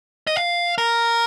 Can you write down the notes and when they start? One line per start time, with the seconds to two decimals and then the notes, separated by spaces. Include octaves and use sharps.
0.27 D#5
0.36 F5
0.78 A#4